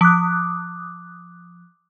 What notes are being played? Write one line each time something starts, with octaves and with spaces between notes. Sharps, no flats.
F3 D6 D#6 F#6